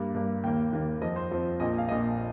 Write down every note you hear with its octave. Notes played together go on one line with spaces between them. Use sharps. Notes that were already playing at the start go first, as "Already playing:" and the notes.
Already playing: G2 G3 A#3
G2 G3 A#3
D#2 D#3 A#3 G5
D#2 D#3 A#3
F2 F3 C4 D#5
C5
F2 F3 C4
A#1 A#2 A#3 D#5
F5
A#1 A#2 A#3 D#5